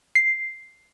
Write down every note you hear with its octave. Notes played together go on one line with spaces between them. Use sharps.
C7